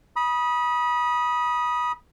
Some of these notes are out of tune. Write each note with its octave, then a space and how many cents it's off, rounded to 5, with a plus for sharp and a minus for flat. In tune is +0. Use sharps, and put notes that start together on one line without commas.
B5 -25 D#6 +10